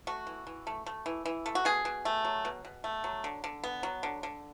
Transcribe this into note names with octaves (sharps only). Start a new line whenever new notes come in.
A3 F#4
E3
E3
A3
A3
E3
E3
A3
F#4
B2 G#4
B2
A3
F#3
B2
B2
A3
F#3
D3
D3
B3
F#3
D3
D3